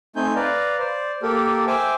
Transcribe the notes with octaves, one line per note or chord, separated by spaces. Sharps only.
A3 C4 D#4 G#5 G6
B4 D5 F5 A#5
C5 D5
A#3 G4 A4 A#4
C5 E5 G5 G#5 D6